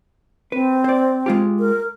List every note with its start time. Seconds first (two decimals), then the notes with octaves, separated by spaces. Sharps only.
0.52 C4 B4
0.84 C5 D5
1.26 G#3 F4 G4
1.60 A#4